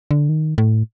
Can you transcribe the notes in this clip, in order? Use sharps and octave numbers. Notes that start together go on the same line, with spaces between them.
D3
D#3
A2